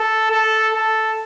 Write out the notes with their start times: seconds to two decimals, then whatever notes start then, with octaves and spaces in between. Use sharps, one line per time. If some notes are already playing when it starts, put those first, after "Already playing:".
Already playing: A4
0.31 A4
0.74 A4